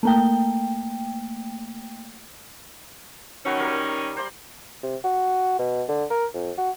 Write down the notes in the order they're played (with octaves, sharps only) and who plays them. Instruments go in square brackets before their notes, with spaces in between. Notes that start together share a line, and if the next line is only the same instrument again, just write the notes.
[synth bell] A3 A#3 G5
[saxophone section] D#3 C#4 [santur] F#3 B4
[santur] G3 A#4
C5 D5 C6
[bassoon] C3
F#4
B2
D3
A#4
F2
F#4